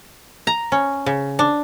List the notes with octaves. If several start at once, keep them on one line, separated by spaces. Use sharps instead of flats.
A#5
C#4
C#3
D4